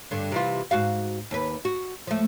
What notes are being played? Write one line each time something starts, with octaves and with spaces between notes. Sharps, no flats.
G2 D3
C3 E3 F4
G#2 F#4 F5
D#2 B4
F#4
F3 A3